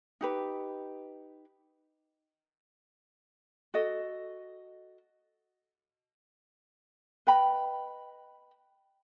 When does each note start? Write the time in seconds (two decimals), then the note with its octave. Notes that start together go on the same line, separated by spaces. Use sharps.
0.21 D#4 G4 B4
3.74 F#4 A4 D#5
7.27 B4 D#5 G5 B5